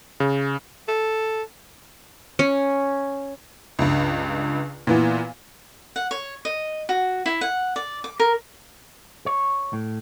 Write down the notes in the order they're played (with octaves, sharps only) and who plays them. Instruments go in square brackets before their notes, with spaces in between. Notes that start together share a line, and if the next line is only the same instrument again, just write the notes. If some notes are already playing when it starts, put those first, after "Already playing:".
[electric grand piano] C#3
[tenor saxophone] A4
[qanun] C#4
[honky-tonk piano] C#2 G2
A#2 E3 B3
[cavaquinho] F#5
C#5
D#5
F#4
E4
F#5
D5
D6
A#4
[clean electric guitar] C#5
A2